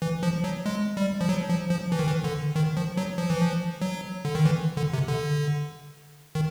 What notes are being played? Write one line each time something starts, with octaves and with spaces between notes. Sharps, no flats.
E3
F3
F#3
G#3
G3
F3
F#3
F3
F3
E3
D#3
E3
D3
D#3
F3
F#3
F3
E3
F3
F#3
D3
D#3
E3
D3
C3
D3
D#3